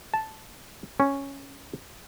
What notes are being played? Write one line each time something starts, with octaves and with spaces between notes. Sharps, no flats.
A5
C#4